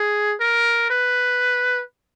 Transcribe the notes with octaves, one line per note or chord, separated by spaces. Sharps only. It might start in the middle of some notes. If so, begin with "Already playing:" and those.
Already playing: G#4
A#4
B4